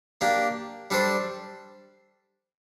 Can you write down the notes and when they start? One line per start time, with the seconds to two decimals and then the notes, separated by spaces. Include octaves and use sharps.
0.21 A#3 D4 G4
0.91 G3 D4 A4 C5